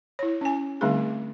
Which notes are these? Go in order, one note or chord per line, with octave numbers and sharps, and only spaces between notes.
E4 C#5
C#4 G#5
D3 G3 A3 C4 D#4 G#4